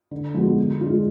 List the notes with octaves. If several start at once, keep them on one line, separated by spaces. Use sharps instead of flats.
D3
F3 G#3 B3 F#4
D3
G#3 D4 F4